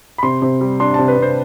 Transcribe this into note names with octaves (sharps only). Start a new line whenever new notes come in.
B5
C3 C6
C3
G3
D4 C6
C3 A5
B4
C3 C5